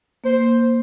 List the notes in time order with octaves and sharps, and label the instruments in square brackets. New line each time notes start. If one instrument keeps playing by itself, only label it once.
[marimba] A#3 [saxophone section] C5